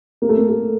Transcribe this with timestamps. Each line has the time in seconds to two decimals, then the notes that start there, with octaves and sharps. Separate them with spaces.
0.22 A#3
0.29 A3
0.37 A#3
0.49 A3